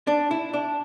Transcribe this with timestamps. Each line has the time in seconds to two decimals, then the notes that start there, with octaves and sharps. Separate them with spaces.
0.07 D4
0.31 E4
0.54 D4